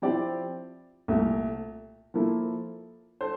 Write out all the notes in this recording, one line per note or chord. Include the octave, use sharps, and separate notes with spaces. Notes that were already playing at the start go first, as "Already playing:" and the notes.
F3 C4 E4 G4 D5
C2 A#2 A3
F3 A#3 E4 A4
A4 C5